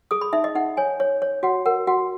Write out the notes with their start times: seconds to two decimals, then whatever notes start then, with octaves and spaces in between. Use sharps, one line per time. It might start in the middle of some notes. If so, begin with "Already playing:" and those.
0.11 G#4 D#6
0.21 B5
0.33 D#4 E5
0.44 D#5
0.55 D#4 F#5
0.77 C#5 G#5
1.00 C#5
1.22 C#5
1.43 F#4 F#5
1.66 A#4 F#5
1.87 F#4 F#5